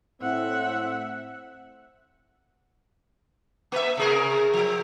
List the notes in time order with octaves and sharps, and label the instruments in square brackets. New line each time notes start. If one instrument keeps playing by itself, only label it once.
[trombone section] A2 C4 [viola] E5 F#5
[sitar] A#3 E5
C3 G#4 A#4
F3